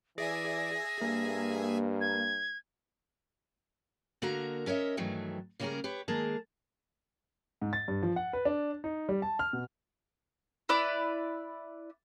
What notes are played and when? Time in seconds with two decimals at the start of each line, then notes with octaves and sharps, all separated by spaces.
0.18 E3 G#4 D5 E5 G#5 A#6
1.01 G2 A#3
2.01 G#6
4.22 D3 A#3 F#4 A#4 A#5
4.66 C#4 A#4 C#5 D#5 E5
4.97 G2 D#3 E3 F#3 A3
5.60 C#3 G3 A#3 C#4 G#4 A#4
5.84 G4 B4 C#5
6.08 D#3 G#3 A#3 G#4 A#4 A5
7.62 G#2
7.73 A6
7.88 G2
8.03 F3
8.16 F#5
8.33 B4
8.45 D4
8.84 D#4
9.09 G3
9.22 A5
9.39 F6
9.53 B2
10.69 E4 B4 D5